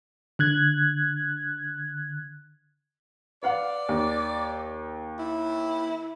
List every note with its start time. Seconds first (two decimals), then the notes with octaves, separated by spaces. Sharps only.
0.39 D3 F#6 G#6
3.43 B4 D5 F5 F#5
3.89 D#2
5.19 E4